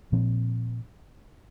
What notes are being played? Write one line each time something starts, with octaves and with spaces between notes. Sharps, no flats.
A#2 F3 C4